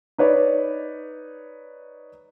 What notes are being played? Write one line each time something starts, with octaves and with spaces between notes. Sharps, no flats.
D#4 B4 C#5 D5